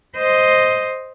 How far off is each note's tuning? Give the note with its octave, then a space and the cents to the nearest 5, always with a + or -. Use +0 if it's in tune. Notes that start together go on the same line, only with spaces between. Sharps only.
C5 +0 D#5 +0